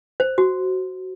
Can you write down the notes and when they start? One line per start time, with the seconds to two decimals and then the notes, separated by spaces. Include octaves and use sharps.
0.20 C5
0.38 F#4